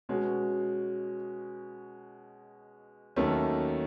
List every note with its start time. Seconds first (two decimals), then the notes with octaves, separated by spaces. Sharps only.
0.09 B2 G#3 C#4 F#4
3.16 D#2 D#3 F#3 A3 C#4